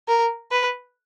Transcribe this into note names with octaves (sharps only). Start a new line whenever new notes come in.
A#4
B4